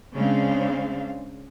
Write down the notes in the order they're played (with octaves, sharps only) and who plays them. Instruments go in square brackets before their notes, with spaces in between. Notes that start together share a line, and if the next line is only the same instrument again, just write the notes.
[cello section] C#3 G#3 C4 D4 F5